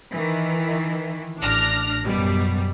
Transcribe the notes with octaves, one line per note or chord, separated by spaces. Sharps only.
D#3 E3
A1 D4 F6 A#6
F#2 B2 G3